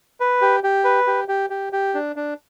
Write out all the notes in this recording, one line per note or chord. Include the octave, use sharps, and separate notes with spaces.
B4
G4
G4
B4
G4
G4
G4
G4
D4
D4